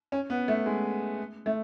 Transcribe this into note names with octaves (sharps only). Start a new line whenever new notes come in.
C#4
B3
A3
G#3
A3